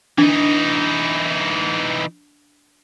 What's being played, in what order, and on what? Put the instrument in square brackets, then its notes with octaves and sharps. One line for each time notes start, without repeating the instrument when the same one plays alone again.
[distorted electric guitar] E3 D#4 [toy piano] D4